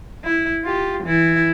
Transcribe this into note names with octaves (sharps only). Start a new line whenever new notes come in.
E4
F4 G4
E3 E4